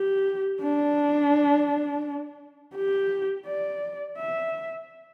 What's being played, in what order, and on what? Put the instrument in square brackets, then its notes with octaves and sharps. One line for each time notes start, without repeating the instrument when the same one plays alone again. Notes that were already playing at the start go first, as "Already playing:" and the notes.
Already playing: [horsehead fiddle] G4
D4
G4
D5
E5